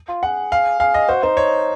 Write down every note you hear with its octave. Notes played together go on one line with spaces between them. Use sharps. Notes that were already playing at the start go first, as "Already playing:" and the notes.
F4
G#4 F#5
F5
G#4 F5
D#5
F#4 C5
D#4 C5
C#5